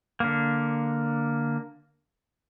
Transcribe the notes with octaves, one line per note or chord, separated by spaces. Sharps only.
D3 A#3